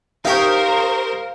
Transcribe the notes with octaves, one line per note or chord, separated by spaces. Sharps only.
D#4 G4 A#4 C5 C#5 F5